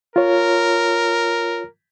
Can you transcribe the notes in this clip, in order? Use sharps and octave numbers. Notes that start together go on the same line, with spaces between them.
F4 A#4 C#5